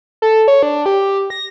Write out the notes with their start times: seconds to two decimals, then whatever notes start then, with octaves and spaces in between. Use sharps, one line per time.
0.22 A4
0.48 C#5
0.63 D4
0.86 G4
1.30 A#6